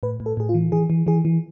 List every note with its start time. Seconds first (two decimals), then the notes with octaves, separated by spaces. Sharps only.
0.03 A2 B4
0.20 A2
0.26 A4
0.37 A2 G#4
0.49 F4
0.54 E3
0.72 E3 G#4
0.90 E3
1.07 E3 G#4
1.25 E3